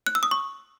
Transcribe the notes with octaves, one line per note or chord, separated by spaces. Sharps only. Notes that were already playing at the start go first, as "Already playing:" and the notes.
F#6
E6
D#6
C#6